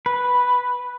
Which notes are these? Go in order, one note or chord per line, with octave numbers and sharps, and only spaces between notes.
B4